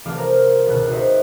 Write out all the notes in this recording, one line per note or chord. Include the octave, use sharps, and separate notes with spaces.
C2 E3 A3 F5 D6 F6
A#4 C5 F5 A#5
G#1 C#2 B2 F#6
F#4 C5 D#5 E5